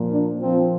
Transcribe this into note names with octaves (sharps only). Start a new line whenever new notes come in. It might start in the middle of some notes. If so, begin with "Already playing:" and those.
Already playing: A#2 F3
D4
A#2 F3 C4